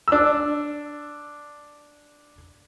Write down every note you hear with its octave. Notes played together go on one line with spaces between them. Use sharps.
D4 E6